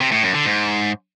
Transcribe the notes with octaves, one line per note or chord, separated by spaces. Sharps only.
C3
A2
F#2
D3
G#2